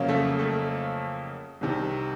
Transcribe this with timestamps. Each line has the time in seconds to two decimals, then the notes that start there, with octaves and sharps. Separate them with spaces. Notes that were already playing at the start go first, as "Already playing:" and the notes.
Already playing: F2 C#3 F#3 A#3 C#4
0.08 A3 A4
0.39 A3 A4
1.61 C2 C3 D#3